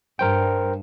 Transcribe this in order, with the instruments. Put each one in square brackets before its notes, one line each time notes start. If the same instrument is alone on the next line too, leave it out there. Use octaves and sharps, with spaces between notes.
[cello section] G2 [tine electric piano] A#4 C5 G5